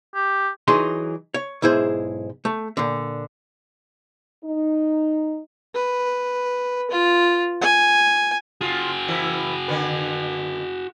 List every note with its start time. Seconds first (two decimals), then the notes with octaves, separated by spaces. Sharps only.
0.15 G4
0.68 E3 F#3 D#4 G#4 C6
1.34 C#5
1.62 B1 G#2 E4 G#4 C5
2.45 A3
2.77 A#2 D3
4.44 D#4
5.75 B4
6.91 F4
7.61 G#5
8.61 F4 F#4 G#4
9.08 E3 E4 A#4
9.68 D3 B3 B4